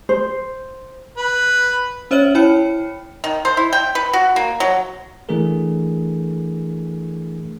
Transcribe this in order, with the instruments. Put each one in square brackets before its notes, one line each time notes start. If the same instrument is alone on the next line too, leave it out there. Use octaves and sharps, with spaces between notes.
[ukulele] C5
[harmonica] B4
[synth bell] C#4 C5 C#5 E5 F6 F#7
E4 C#5 G5 B5 F6 C#7
[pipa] D#3
C5
E4
G5
B4
F#4
A#3
F#3
[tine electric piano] E3 A3 D4 G#4 A#4